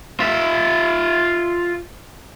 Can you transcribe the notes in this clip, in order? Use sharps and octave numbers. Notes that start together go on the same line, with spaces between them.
F4 E5